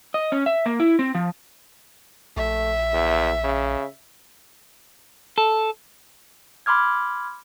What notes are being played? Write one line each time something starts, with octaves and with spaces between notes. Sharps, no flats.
D#5
C#4
E5
A#3
E4
C4
F3
A#1 A3 E5
E2
C#3
A4
B5 C6 D6 F6 G#6